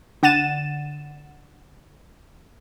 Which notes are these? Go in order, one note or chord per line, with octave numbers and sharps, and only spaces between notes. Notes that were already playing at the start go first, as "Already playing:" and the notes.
D3 F#5 A6 D#7 E7